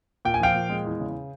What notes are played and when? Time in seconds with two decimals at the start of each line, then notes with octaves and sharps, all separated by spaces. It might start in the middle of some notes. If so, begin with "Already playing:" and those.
0.25 A#2 G5
0.34 G#5
0.40 F3 F5 G5
0.55 A#2
0.69 G#3
0.85 E2
1.00 C#3